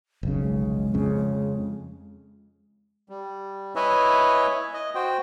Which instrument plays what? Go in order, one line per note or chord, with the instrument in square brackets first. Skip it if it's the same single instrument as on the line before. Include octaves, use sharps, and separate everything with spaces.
[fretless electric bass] F1 B1 C#3
[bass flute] G#3
[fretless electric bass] F2 C#3
[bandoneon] G3
E4 B4 C#5 D#5 E5 G#5
D#5
F#4 C5 G5